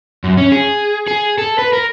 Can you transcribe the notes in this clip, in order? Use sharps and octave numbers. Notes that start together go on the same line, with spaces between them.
F#2
C#4
G#4
G#4
A4
B4
A#4